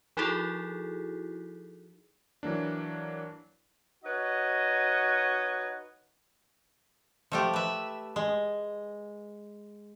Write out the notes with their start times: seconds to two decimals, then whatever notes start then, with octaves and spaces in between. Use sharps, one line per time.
0.17 F3 D#4 E4 F#4 G#4 A4
2.43 E3 F#3 A#3 D4
4.04 D#4 F#4 B4 C#5 D#5
7.32 F3 A3 G4
7.53 B4 E5
8.16 G#3